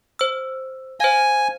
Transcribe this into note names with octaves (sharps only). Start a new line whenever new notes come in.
C5 E6
C5 F5 G#5